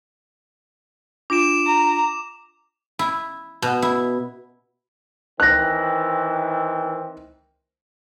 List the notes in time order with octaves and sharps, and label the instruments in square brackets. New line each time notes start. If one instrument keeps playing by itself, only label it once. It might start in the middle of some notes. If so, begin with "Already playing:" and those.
[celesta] D4 F4 D7 [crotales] D6 E7
[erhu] A#5
[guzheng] E4
B2
E4
[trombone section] D#3 E3 C4 [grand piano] F#6 A#6